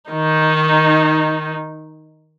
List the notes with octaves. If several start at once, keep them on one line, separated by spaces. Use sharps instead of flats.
D#3 D#4